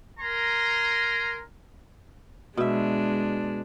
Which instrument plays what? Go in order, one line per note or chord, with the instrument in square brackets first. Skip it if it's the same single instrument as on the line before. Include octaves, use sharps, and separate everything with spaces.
[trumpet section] A#4 G#5 A#5 C6
[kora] B2 E5 [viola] G#3 D4